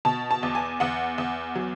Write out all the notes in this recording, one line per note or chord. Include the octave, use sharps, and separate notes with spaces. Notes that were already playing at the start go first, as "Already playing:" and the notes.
B2 A5
A5
E2
G#5
E2 F#5
E2
F#3